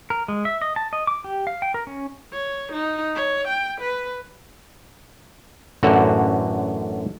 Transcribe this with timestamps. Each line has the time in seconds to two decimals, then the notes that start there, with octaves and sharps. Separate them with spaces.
0.10 A#4
0.28 G#3
0.45 E5
0.62 D#5
0.76 A5
0.93 D#5
1.07 D6
1.24 G4
1.47 F5
1.62 G5
1.74 A#4
1.87 C#4
2.33 C#5
2.73 D#4
3.15 C#5
3.48 G5
3.81 B4
5.83 A1 F#2 D3 F#4